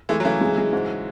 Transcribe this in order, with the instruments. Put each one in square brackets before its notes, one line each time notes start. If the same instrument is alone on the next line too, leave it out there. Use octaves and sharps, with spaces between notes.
[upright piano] E3 G#3 [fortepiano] A3
[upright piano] F#3
[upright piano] C#3 E3 [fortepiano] A3
[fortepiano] G#3
G#3
G#2